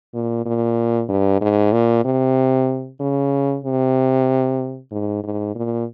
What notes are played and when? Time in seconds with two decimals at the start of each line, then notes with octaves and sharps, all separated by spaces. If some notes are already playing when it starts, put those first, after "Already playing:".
0.14 A#2
0.46 A#2
1.09 G2
1.41 G#2
1.72 A#2
2.05 C3
3.00 C#3
3.65 C3
4.92 G#2
5.23 G#2
5.55 A#2